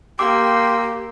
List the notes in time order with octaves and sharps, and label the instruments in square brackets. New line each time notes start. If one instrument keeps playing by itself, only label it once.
[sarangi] A#3 [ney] G4 [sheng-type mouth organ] G5 C6 E6 [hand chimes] D6